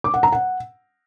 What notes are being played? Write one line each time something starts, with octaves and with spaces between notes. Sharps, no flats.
D6
F#5
A#5
F#5